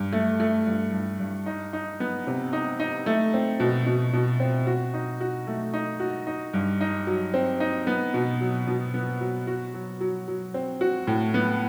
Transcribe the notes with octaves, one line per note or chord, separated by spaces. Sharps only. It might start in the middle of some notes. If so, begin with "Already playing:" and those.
Already playing: G2
A3
A3
G2
G2
G2
D#4
D#4
B3
C3
D#4
D#4
A3
C4
B2
B2
B2
C4
F#4
D#4
F#4
A3
D#4
F#4
D#4
G2
D#4
F#3
C4
D#4
B3
B2
F#3
B2
B3
F#3
F#4
F#3
F#3
F#3
C4
F#4
A2
B3